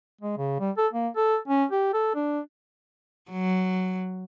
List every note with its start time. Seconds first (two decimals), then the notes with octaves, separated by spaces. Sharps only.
0.21 G#3
0.38 C#3
0.60 G3
0.78 A4
0.93 A#3
1.16 A4
1.48 C#4
1.72 G4
1.94 A4
2.15 D4
3.31 F#3